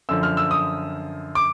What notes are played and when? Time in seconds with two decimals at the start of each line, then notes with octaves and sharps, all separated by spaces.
0.09 F#2 D3 F3 E6
0.23 F6
0.37 E6
0.51 D#6
1.35 D6